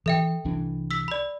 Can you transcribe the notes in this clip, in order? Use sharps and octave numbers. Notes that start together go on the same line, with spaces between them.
E3 A4 E5 G5
C2 E3 D4
E6 B6
D5 B5